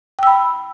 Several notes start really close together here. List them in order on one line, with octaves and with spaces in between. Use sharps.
G5 E6 B5